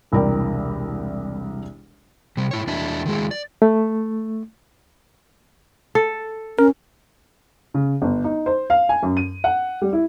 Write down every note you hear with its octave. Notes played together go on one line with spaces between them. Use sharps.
E1 C2 E4 A#4 D5 G5
C3 G3
G#2 E4 C#5
E2 D4 E4
D#3 G#3 E4
D5
A3
A4
C#4 A#4
C#3
G1
D#4
C5
F5
G#5
F#2
D#7
F#5
G3
E4